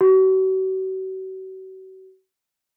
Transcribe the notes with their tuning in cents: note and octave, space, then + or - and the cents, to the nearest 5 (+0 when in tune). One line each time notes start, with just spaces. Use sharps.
F#4 +40